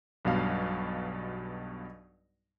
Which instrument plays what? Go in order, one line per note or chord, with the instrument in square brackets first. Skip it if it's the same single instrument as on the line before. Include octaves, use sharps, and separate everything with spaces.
[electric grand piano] B1 G2 B2 F5